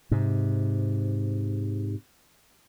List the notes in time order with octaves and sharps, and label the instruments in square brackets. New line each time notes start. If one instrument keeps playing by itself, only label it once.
[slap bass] G#2 C3